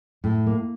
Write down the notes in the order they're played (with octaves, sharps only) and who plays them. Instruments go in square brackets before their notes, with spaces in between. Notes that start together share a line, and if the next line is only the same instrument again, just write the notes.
[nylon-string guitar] A2
A#3